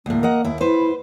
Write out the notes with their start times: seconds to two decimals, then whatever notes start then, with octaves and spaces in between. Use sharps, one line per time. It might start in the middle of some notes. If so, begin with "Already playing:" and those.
0.06 D2 A2 A#3
0.23 A#4 D#5 F#5
0.44 D#2 E4
0.61 E4 B4 C5